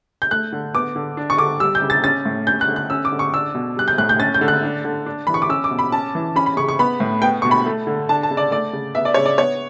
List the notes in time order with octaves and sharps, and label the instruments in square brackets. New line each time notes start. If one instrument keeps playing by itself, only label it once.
[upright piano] G6
A3 F#6
D3
B3 D6
D3
D4
C#6
D3 D6
G3 E6
G6
C#3
A6
C#4 A6
A2
C#4 G6
F#6
D3
F#6
C#4 E6
D6
D3
C#6
D4 E6
B2
G3 F#6
G6
A2 F#6
G6
C#4 A6
G6
D3
F#6
D4
D3
D4
E3 B5
C#6
D6
C#4 E6
D6
B2
B5
C#4 A5
E3
C#4 B5
B5
C#3 C#6
C#6
B3 B5
A2
B3 G5
B2 C#6
B5
A3
D3
D4 A5
A5
C#3
D5
A3 D5
C#3
B3 E5
D5
C#3 C#5
D5
B3 C#5